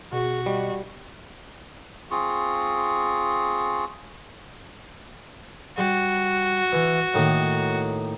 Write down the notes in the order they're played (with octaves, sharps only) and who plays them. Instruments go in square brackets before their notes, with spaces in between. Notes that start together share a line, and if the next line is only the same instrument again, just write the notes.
[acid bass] B2 [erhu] F#4 [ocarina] G#4
[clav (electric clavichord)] G3 [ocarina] D#5
[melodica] C4 F4 G#4 C#6
[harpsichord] G3 [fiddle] F#4
[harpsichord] E3
A2 D#3 A#3